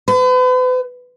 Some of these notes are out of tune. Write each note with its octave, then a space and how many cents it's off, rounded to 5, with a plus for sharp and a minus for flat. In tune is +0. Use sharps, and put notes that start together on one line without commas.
B4 +40